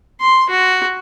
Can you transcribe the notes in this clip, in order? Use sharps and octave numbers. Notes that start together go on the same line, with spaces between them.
C6
F#4